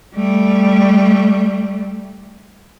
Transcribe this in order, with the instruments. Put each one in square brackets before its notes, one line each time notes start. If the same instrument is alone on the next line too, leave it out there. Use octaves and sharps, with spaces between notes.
[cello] G3 A3